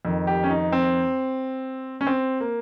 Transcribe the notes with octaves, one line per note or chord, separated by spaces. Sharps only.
F2 D#3
G4
C#4
D#4
C4
C#4
C4
A#3